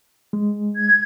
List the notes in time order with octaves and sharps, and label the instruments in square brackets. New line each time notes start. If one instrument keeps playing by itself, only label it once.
[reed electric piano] G#3
[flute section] G#6